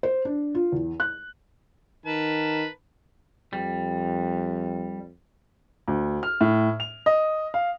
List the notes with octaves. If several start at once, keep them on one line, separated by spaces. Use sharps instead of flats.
C5
D4
F4
E2
F#6
D#3 A#4 B4 A5
F2 G3
D2
F6
A2
F7
D#5
F5